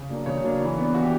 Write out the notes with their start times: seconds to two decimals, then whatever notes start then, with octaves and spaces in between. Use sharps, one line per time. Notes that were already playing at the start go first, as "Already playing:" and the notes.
Already playing: C#3
0.10 F#3 A#3 D4
0.26 C#3 C#5
0.44 F#3 A#3 D4
0.61 E3
0.78 B3 D4
0.94 E3 F#4
1.03 G4